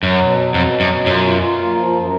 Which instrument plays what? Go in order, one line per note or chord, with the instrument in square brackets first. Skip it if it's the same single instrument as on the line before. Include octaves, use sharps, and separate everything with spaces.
[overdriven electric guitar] F#2 [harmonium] F#3
[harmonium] B2
F#3
[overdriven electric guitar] F2 [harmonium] B2
[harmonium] F#3
[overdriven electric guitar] F#2
[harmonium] B2
[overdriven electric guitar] F#2 [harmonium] F4
[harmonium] F4
F4
A#3
F3
F#2